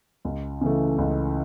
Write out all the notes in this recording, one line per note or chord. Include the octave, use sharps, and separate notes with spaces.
C#2
C#3 E3 A3
C#2